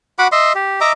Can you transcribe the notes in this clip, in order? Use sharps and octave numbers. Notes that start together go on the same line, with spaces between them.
F#4 F#5 B5 D6
D#5 E5 C6
G4
D#5 E5 A#5 D6